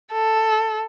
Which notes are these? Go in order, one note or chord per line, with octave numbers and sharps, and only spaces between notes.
A4